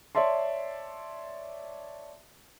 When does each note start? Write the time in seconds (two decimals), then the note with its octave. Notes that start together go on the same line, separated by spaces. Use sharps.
0.15 C#5 D5 E5 A5 C6